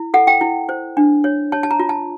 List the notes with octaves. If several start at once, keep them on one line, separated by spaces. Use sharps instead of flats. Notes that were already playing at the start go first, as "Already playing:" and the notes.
Already playing: E4
A4 F#5
G5
E4
C5
D4
C#5
C#5 A5
A5
A#5
F4
A5